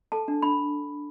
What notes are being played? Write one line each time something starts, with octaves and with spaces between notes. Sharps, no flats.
A4 A5
D4
D4 B5